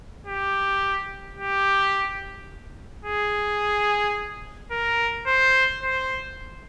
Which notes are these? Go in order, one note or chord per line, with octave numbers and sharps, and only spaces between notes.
G4
G4
G#4
A#4
C5
C5